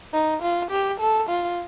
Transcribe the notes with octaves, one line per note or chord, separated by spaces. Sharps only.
D#4
F4
G4
A4
F4